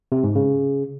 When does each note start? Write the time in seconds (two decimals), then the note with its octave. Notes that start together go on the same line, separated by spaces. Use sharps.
0.12 C3
0.24 G#2
0.36 C#3